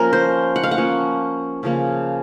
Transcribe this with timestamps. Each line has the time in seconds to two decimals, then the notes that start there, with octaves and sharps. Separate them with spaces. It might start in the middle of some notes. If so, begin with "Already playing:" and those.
Already playing: F3 A#3 C#4 A#4
0.13 C5
0.56 F#5
0.63 F5
0.71 F#5
0.77 F3 A#3 C#4
1.63 C#3 F3 A#3